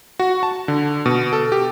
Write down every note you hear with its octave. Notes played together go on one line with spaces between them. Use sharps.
F#4
A5
D3
B2
A4
G4